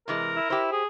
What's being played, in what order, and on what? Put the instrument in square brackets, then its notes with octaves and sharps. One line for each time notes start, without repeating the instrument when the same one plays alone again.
[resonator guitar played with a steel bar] C3 E3 G#3 [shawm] A#4
[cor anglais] E4
[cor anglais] E4 [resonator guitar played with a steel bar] G4 C5
[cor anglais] G#4